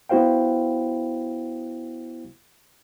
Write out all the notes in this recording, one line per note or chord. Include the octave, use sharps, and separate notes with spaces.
B3 E4 F#4 C5 F5 G5